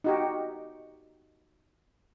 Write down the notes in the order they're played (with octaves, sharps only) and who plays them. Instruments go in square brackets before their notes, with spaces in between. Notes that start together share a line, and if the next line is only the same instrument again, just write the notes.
[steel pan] D#4 F#4 G4